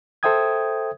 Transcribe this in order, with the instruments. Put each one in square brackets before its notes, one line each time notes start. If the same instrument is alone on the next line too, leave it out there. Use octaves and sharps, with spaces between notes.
[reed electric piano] A4 C5 E5 G5 D#6 G#6